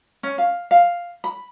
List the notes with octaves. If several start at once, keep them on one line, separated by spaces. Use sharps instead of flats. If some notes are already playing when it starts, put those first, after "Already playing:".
C#4
F5
F5
B5